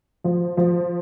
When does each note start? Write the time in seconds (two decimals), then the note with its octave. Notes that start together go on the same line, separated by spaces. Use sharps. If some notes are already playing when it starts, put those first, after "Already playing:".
0.24 F3
0.57 F3